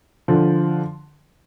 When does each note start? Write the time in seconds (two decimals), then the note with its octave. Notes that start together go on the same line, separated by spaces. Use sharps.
0.28 D3 F3